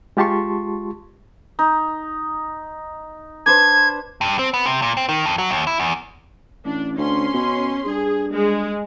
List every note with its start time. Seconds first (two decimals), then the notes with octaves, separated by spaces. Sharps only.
0.17 G#3 F4 G4 A5 C6 C#6
1.59 D#4
3.46 D4 B4 C5 G#6
4.21 G2
4.39 C4
4.54 B3
4.66 C3
4.82 A#2
4.97 C4
5.09 D#3
5.26 F2
5.38 F#3
5.51 D#2
5.67 E4
5.80 E2
6.65 A1 D4
6.98 D2 C#4 C6
7.34 B2
7.86 G2 G#4
8.32 G#3